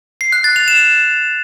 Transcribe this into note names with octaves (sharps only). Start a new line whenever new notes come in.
C7
F#6
A6
F7
E7